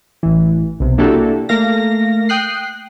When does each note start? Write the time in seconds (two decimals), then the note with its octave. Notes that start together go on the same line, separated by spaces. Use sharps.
0.23 A1 E3
0.80 B1 C3
0.98 A#3 D4 E4 F#4 G4 A4
1.49 A3 A#3 F5 A#6
2.29 G5 D#6 F#6 C7